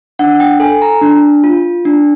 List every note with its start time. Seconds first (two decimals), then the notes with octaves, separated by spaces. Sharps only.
0.19 D4 F#5
0.40 G5
0.60 A4 G#5
0.82 A#5
1.02 D4
1.44 F4
1.85 D4